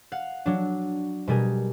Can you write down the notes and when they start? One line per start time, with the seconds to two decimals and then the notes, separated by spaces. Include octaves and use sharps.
0.12 F5 F#5
0.46 F#3 D4
1.27 B2 G3 G#4 A#4